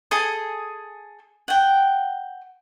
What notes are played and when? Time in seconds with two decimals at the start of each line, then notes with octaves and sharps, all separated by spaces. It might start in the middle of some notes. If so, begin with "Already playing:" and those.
0.11 G#4 A4 G#5 D#6
1.48 F#5 G5